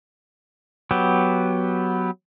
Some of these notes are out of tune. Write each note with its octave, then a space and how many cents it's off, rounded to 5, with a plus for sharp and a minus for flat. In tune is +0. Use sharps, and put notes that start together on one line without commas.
F#3 +0 B3 +0 G4 +0